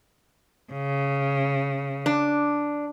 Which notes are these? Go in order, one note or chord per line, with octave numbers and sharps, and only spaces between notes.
C#3
D4